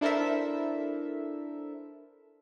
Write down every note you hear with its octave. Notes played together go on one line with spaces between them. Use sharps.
D4 E4 A4 A#4 C5 E5